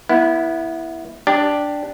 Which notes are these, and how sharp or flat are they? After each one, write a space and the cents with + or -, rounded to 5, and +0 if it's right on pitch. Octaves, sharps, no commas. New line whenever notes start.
B3 -25 E4 +0
D4 +0 G4 +0